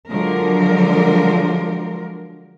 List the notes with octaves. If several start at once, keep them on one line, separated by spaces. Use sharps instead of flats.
D3 F3 F#3 G#3 A#4